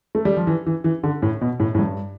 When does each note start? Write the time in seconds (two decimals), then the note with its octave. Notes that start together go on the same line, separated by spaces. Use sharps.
0.15 A3
0.25 G3
0.37 F3
0.47 E3
0.67 E3
0.84 E3
1.03 D3
1.22 A2
1.41 B2
1.60 A2
1.75 A2
1.79 G2